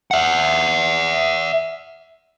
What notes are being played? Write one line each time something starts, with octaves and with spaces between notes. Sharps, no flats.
E5 F#5